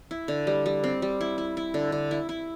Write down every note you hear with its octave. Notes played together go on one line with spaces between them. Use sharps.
E4
D3
G3
G3
C4
G3
E4
E4
E4
D3
D3
E4
E4